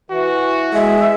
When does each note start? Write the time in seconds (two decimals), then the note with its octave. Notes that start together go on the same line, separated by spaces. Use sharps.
0.10 E3 F#4
0.73 G#3 E5